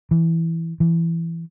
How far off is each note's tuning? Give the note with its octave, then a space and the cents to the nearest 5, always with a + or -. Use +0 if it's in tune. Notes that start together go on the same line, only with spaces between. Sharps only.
E3 +0
E3 +15